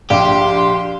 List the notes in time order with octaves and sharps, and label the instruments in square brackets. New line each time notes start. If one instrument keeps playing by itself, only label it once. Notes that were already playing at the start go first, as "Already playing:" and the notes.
[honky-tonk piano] A#1 [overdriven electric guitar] G4 [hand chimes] D5 F5 [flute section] C6